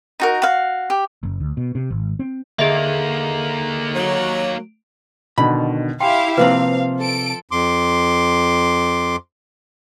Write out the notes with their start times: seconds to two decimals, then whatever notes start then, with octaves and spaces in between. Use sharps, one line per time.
0.20 D#4 F#4 A#4
0.42 F#4 F5
0.90 G4
1.23 F#1
1.40 D2
1.57 B2
1.75 C3
1.90 G#1
2.19 C4
2.59 D3 A#3 D#4 G#4 D#5 E5
3.94 F#3
5.38 B2 D3 D#3 B5
6.00 E4 G4 F5 G5 G#5 C6
6.37 C3 F3 A#3 C4 B4 C5 F5
6.99 A4 D7
7.51 F2 C6 D6